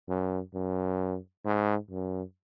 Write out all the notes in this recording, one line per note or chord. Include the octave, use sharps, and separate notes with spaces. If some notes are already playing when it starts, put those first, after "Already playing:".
F#2
F#2
G#2
F#2